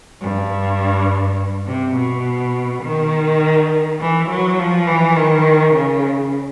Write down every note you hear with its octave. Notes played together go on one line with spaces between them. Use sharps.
G2
C3
B2
D#3
E3
F#3
F3
E3
D#3
C#3